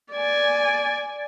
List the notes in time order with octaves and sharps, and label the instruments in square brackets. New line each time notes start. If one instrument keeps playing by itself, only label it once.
[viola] D5 G#5